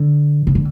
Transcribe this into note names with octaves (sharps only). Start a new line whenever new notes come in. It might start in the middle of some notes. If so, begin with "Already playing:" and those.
Already playing: D3
C#3
D3